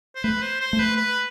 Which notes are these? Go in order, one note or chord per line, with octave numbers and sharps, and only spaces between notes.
C5
A3 B4
C5
C5
A3
B4
B4